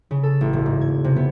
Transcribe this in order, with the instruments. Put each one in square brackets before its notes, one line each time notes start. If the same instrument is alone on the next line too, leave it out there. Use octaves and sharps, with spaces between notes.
[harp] C#3
A4
A1
E1
G#2
G#6
C3
B3